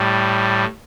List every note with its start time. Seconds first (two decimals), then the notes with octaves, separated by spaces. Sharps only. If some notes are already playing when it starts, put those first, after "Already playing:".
Already playing: A2 G3